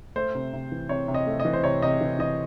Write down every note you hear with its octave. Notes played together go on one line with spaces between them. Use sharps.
A3 C5
C3
C3
E3
C3 C#5
C3
D#5
A3
D#5
E3
C5
C3 C#5
C3 D#5
E3
E3 D#5